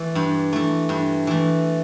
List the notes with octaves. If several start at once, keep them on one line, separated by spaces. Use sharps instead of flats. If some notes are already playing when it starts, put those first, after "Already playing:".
Already playing: E3 A3
G2
E3 A3
G2
E3 A3